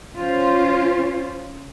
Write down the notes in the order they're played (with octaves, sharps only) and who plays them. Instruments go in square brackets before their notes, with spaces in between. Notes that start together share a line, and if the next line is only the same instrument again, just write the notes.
[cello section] C#4 F4 C5